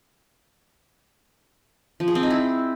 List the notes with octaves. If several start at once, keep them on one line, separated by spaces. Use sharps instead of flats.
F3
G#4
C4
D#4
E4